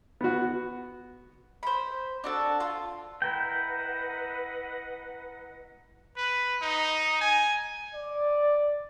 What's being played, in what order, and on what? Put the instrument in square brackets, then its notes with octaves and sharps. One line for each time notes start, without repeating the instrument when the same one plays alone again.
[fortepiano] B3 F#4
[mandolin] C5 B5
D4 F#4 A4
F4
[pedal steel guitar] E4 A#4 G5 [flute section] B4 D#5 F#5
[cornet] B4
D#4
G#5
D5